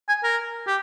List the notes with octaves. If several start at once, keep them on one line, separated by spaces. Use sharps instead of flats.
G#5
A#4
G4